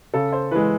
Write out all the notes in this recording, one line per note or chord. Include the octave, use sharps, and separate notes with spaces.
C#3 A4
C5
E3 G#3 B4